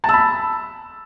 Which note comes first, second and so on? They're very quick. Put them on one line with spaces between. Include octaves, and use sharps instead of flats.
A5 E6 B5